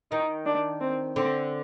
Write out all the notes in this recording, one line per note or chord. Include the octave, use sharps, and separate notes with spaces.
D#3 D#4
D4
C4
D3 C4